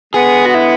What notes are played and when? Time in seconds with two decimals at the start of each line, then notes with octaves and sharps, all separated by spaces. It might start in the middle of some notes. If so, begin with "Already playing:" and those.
0.14 D3 G#3 B3 G#4
0.46 F#4
0.54 E4